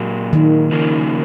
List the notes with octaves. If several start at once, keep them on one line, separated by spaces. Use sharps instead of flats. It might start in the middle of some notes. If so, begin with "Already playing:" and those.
Already playing: A#2 F#3 A#3
D#3
C#3 F3 A#3